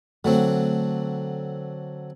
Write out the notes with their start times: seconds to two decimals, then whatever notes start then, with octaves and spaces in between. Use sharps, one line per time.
0.25 D3 F#3 A3 C4